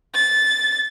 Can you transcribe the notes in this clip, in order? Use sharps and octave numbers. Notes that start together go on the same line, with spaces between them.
A6